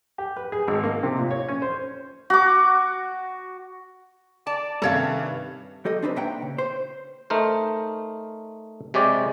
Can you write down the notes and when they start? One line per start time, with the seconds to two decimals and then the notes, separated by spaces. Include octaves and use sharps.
0.18 G4
0.36 B4
0.52 G#4
0.67 G#1
0.84 A#3
1.03 C3
1.19 A#2
1.31 C#5
1.48 C#4
1.62 C5
2.30 F#4 D6
4.47 D5 A5
4.82 G2 C3 D#3 C#4 A4 C#5 F5
5.85 F#3 G4 A4 D#5
6.02 C4 D4 D#4 B4 C5
6.16 A#2 E5 F#5 G5 A#5
6.42 C#3
6.58 C5
7.30 A3 D#4 A#4 C5
8.94 C3 G#3 G4 C#5 D5